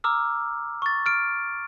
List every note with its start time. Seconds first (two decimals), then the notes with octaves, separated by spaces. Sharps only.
0.04 A#5 D6 E6 F6
0.82 C#6 A6
1.06 F6 D7